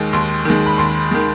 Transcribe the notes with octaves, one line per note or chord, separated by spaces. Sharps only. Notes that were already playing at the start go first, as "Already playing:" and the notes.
Already playing: D#2 D#3 G#3
D#2 C6
D#3 G#3
B5
D#2 C6
D#3 G#3